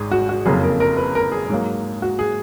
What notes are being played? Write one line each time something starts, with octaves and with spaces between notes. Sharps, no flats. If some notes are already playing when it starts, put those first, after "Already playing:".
Already playing: G#1 G#2 G#4
F#4
F#4
F#1 F2 C#3 F#3 A#3 G#4
A#4
A#4
B4
A#4
G#4
G#2 F#3 A#3
F#4
G#4